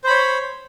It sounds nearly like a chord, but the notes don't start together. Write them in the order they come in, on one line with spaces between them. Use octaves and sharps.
C5 B5 C#5